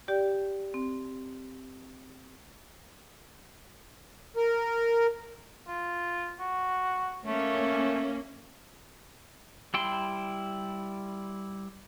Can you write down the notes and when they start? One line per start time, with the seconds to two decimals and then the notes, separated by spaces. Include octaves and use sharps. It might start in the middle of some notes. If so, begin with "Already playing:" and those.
0.08 G4 D5 G5
0.74 C4
4.37 A#4
5.67 F4
6.40 F#4
7.25 A3 A#3 C#4
9.74 G3 E4 G5 C6